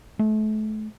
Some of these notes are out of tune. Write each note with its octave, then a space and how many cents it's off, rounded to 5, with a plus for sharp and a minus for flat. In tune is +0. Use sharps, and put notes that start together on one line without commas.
A3 -35